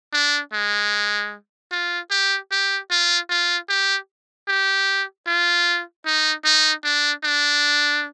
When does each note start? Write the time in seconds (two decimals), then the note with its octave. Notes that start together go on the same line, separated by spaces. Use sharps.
0.13 D4
0.53 G#3
1.72 F4
2.11 G4
2.51 G4
2.91 F4
3.29 F4
3.69 G4
4.48 G4
5.27 F4
6.06 D#4
6.45 D#4
6.84 D4
7.24 D4